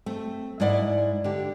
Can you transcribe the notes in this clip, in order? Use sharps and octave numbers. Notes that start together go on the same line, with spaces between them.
A3 C4
G#2 G#3 E4 D5 E5 F#5
D3 G4